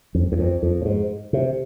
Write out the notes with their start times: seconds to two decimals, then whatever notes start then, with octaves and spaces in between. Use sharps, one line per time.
0.15 F2
0.32 E2
0.39 F2
0.63 F2
0.82 A2
0.85 G#2
1.33 C3